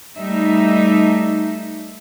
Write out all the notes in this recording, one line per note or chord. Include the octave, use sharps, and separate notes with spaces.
G3 A3 D#4 E5